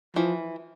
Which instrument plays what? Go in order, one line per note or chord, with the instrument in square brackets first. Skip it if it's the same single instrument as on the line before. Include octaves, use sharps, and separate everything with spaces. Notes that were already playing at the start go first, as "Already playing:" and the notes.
[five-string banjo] E3 [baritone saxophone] F3